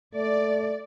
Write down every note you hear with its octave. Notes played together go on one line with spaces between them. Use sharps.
A3 D5